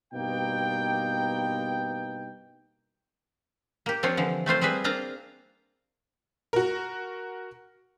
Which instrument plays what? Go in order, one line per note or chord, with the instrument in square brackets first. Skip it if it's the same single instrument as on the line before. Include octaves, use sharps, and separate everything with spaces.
[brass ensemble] G2 B2 A#3 D#4 B4 G5
[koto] A#3 G4
F3 C4 D4 F4 C#5
D3 E3 F3
A3 C4 F4 C5
G3 C4 G#4 B4 E5
A#3 C4 D4 F4 F5 A#5
[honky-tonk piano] F#4 A#4